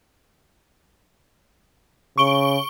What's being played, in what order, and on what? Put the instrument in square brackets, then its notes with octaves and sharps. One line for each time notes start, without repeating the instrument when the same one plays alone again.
[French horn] C#3 [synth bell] C#6 D7 G7